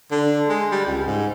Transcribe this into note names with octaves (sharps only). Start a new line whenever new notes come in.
D3
G#3
G3
C#2
G#2